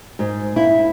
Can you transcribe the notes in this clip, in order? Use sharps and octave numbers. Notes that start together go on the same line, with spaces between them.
G#2
E4